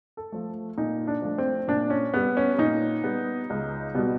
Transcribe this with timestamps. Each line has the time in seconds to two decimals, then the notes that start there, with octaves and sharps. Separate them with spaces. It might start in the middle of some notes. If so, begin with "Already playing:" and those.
0.17 A4
0.32 F3 A3
0.78 A#2 D#4
1.07 D4
1.22 F3 A3
1.38 C4
1.68 A#2 D4
1.90 C#4
2.14 G3 B3
2.37 C#4
2.58 A#2 D#4
3.04 G3 B3
3.50 C#2
3.95 B2 G3 B3